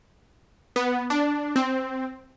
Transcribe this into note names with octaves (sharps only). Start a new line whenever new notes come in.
B3
D4
C4